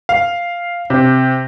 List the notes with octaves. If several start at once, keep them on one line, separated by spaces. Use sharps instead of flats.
F5
C3